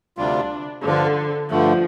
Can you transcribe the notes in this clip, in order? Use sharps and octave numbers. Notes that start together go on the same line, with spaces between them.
D2 C3 G3 D4 F4
G2 D3 F3 D4 F4
G2 D3 F3 A3